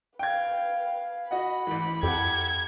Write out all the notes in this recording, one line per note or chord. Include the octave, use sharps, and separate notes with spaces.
B4 F5 G5 G#6
F#4 D#5 F#5 B5
A1 E3
F2 G4 A4 F#5 G#6